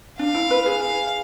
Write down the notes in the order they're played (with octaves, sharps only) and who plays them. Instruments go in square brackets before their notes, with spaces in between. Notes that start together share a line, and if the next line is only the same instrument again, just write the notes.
[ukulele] D4 [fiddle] F5
[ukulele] E4
B4
G#4
[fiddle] F5